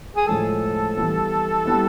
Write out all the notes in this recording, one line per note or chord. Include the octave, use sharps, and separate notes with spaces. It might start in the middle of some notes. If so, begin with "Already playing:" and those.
G#4
A2 F3 G#3 A4
E3 G3 B3 E4
G3 B3 E4